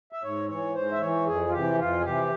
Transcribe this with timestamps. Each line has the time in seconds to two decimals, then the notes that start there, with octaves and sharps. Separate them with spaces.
0.13 E5
0.24 G#2 C#5
0.49 E3 C#5
0.75 G#2 C5
0.92 E5
1.01 E3 C#5
1.27 F2 G#4
1.49 F4
1.53 C3 E3 G4
1.79 F2 F4
2.00 G#4
2.04 C3 E3 G4